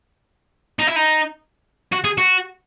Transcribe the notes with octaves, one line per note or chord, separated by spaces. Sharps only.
D#4
E4
D#4
F#4
G#4
F#4